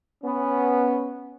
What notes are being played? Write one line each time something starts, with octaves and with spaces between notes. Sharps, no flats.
B3 C#4